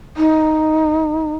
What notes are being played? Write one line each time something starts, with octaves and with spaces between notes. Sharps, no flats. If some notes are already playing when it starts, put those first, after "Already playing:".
D#4